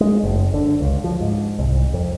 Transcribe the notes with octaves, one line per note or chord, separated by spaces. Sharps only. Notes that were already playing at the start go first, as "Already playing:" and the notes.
G#3
F#1
D3
C#2
F3
G#2
C2
F2